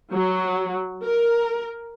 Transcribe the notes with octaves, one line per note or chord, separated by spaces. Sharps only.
F#3
A#4